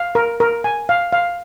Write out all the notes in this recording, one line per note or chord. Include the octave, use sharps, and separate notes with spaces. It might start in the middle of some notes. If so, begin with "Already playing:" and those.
Already playing: F5
A#4
A#4
G#5
F5
F5